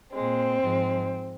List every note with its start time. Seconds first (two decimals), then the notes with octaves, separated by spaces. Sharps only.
0.15 A#2 G#3 C4
0.62 G#2 F3 G#3